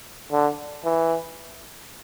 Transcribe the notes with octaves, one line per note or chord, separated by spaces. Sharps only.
D3
E3